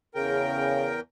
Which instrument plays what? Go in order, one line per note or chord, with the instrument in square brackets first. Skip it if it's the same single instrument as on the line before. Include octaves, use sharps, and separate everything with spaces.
[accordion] E2 A#4 G5 [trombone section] C#3